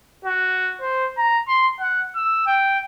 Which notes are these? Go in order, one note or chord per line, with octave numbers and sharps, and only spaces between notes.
F#4
C5
A#5
C6
F#5
E6
G5